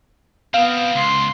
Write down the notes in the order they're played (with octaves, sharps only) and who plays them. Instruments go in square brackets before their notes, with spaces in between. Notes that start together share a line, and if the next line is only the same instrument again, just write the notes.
[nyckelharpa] B3 [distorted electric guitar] C4 A#4 [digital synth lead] F5
[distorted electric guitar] C#2 [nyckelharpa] C6